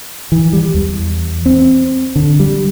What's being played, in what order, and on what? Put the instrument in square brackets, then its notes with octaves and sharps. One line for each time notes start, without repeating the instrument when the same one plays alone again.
[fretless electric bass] E3
G3
E2
C4
D3
G3